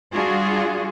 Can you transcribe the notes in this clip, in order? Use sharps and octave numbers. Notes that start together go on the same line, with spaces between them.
G3 D4 F4 F#4 G#4